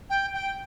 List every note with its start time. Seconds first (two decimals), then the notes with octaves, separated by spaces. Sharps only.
0.09 G5
0.33 G5